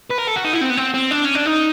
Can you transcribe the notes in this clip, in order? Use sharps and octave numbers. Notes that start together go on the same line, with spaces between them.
B4
A#4
A4
F#4
D#4
E4
C4
B3
C4
C4
D4
C#4
D4
D#4